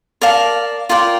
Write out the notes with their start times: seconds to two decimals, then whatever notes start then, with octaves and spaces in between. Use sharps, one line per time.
0.21 A#4 D5 F5 A5
0.89 F4 A#4 D5 G5